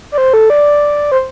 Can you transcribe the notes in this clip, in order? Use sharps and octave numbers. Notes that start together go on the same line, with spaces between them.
D5
C5
A4
D5
C5